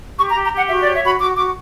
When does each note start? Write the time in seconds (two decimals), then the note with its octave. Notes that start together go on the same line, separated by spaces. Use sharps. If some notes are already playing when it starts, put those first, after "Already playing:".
0.18 G4 C#6
0.31 A#5
0.35 G4
0.44 A#5
0.52 G4 F#5
0.69 F#4 E5
0.82 D5
0.85 C#5
0.94 E5
1.02 F#4 B5
1.19 F#4 D6
1.36 F#4 D6